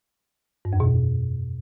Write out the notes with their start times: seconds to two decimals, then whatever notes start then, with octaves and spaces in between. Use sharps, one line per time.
0.65 G2
0.73 F2
0.80 B2